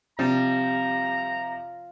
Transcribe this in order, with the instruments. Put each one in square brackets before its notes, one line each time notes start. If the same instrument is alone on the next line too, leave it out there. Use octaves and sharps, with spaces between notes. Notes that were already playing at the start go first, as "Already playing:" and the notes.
[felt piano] C3 [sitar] F3 [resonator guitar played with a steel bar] G3 [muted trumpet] A#5